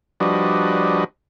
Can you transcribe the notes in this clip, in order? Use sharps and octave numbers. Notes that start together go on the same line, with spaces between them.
F3 G3 D4 F#4 B4 D#5